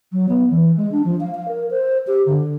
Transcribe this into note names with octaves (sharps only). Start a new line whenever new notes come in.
F#3
B3
E3
G#3
D4
F3
F5
F5
A#4
C5
G4
D3